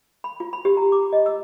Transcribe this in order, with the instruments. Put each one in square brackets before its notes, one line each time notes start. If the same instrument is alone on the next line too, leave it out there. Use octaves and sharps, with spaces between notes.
[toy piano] B5
F4
B5
G4
A#5
D6
D#5
E6